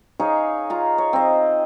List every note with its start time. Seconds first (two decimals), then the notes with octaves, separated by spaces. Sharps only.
0.20 D#4 G#4 C#5 F5
0.70 F4 A#5
0.98 C#5
1.13 C4 D#5